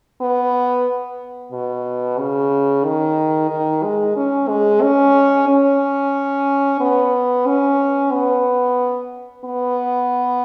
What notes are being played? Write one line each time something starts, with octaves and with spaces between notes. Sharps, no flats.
B3
B2
C#3
D#3
D#3
G#3
C#4
G#3
C#4
C#4
B3
C#4
B3
B3